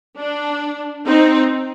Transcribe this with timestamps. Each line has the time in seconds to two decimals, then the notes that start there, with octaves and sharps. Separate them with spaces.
0.18 D4
1.07 C4 D#4